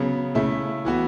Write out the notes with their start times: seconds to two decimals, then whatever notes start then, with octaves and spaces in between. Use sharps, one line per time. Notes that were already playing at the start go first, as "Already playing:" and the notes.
Already playing: C#3 F#3 B3
0.35 C#3 A3 E4
0.85 E3 B3 F#4